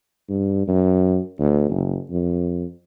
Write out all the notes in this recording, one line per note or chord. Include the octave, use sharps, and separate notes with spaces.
G2
F#2
D2
F#1
F2